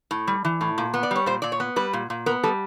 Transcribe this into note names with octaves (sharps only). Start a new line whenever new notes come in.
A2
G3
E3
A2
A#2
B3
D5
G3 C#5
A#2 C5
A#2 D5
C#5
B3
G3 B4
A#2
A#2
B3 A#4
G3 A4